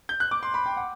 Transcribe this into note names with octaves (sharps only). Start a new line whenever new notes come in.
G6
F#6
D6
C6
B5
G5
F#5